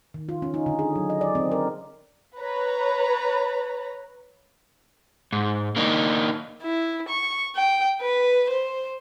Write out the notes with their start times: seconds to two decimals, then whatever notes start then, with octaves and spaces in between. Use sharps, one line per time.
0.14 D#3
0.29 F4
0.42 C#4
0.54 D#4
0.66 D3
0.79 G#4
0.96 F#3
1.10 D#5
1.21 D5
1.35 C4
1.52 A#4
2.38 B4 C#5 A#5
5.33 G#2
5.76 A#3 D4 D#4
6.62 E4
7.09 C#6
7.55 G5
8.02 B4
8.49 C5